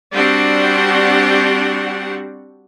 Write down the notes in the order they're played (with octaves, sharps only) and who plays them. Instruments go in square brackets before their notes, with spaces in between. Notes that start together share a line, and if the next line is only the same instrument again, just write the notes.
[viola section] G3 C4 D4 F#4 G4 F#5